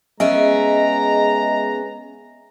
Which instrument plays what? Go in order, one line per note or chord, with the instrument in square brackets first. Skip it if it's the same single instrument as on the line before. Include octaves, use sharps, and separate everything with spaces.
[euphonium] G#3 [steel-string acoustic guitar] B3 C#4 G#4 [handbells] D#5 E5 D7 [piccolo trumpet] A#5